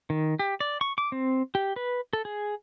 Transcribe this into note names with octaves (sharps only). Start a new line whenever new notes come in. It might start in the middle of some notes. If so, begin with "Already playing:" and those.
D#3
G4
D5
C#6
D6
C4
G4
B4
A4
G#4